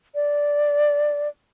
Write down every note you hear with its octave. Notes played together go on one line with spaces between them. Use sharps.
D5